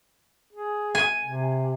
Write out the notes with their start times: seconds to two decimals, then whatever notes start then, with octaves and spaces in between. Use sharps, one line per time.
0.53 G#4
0.95 G#5
1.25 C3